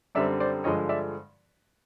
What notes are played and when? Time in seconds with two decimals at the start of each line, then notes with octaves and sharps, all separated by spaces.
0.15 F#2 D3 G3 C4 D5 E5
0.40 C5 D5
0.64 G2 D3 F3 G#3 C#5 D#5
0.89 D5 E5